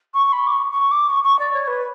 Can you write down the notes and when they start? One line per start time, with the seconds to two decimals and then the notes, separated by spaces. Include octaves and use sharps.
0.14 C#6
0.32 B5
0.47 D6
0.52 C#6
0.71 C#6
0.91 D6
1.09 C#6
1.24 C#6
1.39 D5
1.53 C#5
1.67 B4